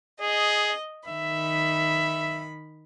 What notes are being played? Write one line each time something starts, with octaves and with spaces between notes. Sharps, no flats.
G#4 D#5
D#3 E5 B5